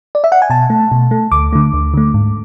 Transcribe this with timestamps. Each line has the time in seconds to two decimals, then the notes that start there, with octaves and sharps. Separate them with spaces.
0.15 D5
0.24 E5
0.32 F#5
0.42 G#5
0.50 B2 A5
0.70 A3
0.92 B2
1.11 A3
1.32 D2 D6
1.53 D3 A3
1.73 D2
1.94 D3 A3
2.14 G#2